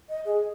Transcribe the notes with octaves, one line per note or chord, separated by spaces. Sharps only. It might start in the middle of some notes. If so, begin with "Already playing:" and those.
D#5
G#4